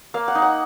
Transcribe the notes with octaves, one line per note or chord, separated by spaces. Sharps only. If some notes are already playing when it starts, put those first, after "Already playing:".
A#3 F5
F#5
D#4
F#5